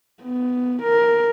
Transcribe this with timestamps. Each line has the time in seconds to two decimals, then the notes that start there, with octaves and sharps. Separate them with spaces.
0.23 B3
0.83 A#4